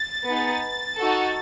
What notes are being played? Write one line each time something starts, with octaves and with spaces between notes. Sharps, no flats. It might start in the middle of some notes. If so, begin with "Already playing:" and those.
Already playing: A6
B3 D#4 G#4
D#4 F#4 A4